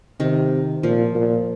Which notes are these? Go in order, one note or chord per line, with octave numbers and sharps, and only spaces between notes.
C3 D#3
A#2 F3
A#2